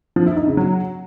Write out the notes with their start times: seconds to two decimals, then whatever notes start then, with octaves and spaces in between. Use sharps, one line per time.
0.16 F3
0.26 E4
0.37 D#4
0.47 C#3
0.57 F#3